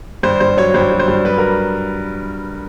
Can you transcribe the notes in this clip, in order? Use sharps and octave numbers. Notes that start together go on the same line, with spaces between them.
G2 C5
G2 C5
F#3 C#5
G2 C5
F#3
C5
G2
F#3 B4
A#4